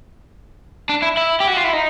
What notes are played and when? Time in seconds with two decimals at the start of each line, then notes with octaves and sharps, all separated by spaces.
0.89 D4
1.02 E4
1.17 E4
1.40 G4
1.48 F#4
1.57 F4
1.64 E4
1.73 D#4